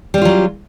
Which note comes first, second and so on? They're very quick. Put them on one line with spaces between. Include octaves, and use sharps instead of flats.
G3 C#4 F4 F#3